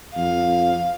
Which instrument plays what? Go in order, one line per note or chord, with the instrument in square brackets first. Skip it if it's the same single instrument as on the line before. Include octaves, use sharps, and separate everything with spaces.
[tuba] F2 [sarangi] F5